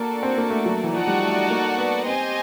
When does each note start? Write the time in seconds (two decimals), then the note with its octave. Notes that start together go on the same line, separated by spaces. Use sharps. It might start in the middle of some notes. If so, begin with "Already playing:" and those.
Already playing: A#3 D4 F#4 A4 D5
0.23 C4
0.37 A#3
0.50 A3
0.65 F#3
0.83 E3
0.93 F3 D#4 F#4 A4 D5 F#5
1.07 G3
1.22 A3
1.50 A#3
1.78 B3
2.07 C4 G4 C5 D#5 G#5